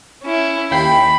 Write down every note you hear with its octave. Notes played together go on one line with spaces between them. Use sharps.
C#4 E4
D#2 G5 B5 C7